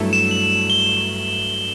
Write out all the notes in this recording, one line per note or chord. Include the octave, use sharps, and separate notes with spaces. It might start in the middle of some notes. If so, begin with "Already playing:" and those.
Already playing: G2 F#3 A3 E4 A4
E7
F#7
G7